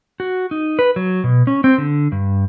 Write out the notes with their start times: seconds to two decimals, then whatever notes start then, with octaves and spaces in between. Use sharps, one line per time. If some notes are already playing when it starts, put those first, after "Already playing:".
0.20 F#4
0.51 D#4
0.79 B4
0.96 F#3
1.24 B2
1.47 C#4
1.64 C4
1.78 D3
2.12 G2